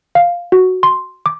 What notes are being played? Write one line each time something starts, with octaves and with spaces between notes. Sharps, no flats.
F5
F#4
C6
D6